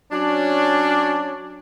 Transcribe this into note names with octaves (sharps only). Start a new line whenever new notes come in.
F#3 C#4 D4